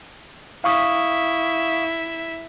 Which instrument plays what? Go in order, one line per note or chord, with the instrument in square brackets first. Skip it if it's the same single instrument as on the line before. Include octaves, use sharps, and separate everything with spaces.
[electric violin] E4 E5 [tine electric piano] F5 C#6 D#6